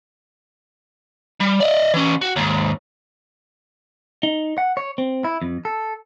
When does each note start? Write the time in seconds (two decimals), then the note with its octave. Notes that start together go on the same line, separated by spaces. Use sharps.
1.41 G3
1.61 D5 D#5
1.94 E3 C#4
2.21 F#4
2.36 D#2 G#2
4.23 D#4
4.58 F#5
4.77 C#5
4.98 C4
5.24 E4
5.42 F2
5.65 A4